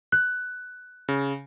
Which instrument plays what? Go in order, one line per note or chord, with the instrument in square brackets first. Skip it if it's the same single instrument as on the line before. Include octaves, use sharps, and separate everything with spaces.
[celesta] F#6
[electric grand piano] C#3